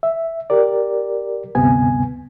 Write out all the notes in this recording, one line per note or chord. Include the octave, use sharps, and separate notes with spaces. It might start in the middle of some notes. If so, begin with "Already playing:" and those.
E5
G4 A#4 D5
D2 G2 C3 B3 G#5